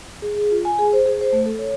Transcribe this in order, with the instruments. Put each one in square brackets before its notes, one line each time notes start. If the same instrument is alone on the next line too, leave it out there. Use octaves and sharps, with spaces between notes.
[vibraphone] G#4
G#4
F4
G#5
G#4
C5
G#4
C5
A3
A4
C#5